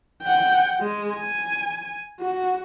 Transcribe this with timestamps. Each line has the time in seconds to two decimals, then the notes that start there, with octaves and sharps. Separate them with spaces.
0.23 F#5 G5
0.81 G#3
1.14 G#5
2.20 F#4